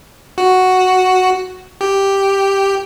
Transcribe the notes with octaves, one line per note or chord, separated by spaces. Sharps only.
F#4
G4